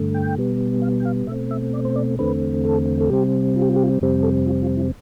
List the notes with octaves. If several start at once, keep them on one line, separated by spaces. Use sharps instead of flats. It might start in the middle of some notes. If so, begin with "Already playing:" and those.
Already playing: G2 D3 A3
G5
B2 G3 B3
F5
G5
F5
B2 A3 C4 E5
E5
D5
C5
D5
E2 D3 A3 C4 B4
A4
A4
C3 G3 C4 G4
F4
G4
F4
G4
F4
F2 C3 G3 C4
A4
F4
F4
E4